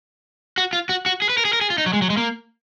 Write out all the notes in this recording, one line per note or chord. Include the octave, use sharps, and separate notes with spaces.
F#4
F4
F#4
F#4
G#4
B4
A#4
G#4
A#4
G#4
F4
D#4
F#3
G#3
F#3
G#3
A#3